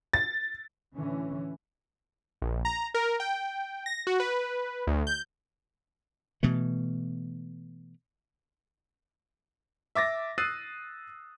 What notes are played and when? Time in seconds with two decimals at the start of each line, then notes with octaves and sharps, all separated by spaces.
0.13 A6
0.94 A2 D3 E3 C#4
2.42 A#1
2.65 A#5
2.94 A#4
3.20 G5
3.86 A#6
4.07 F#4
4.20 B4
4.87 D2
5.07 G6
6.43 B2 E3 A3
9.95 E5 D6 A6 A#6
10.38 D#6 E6 F#6 A6 C7 D#7